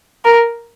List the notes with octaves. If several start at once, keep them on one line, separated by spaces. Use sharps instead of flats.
A#4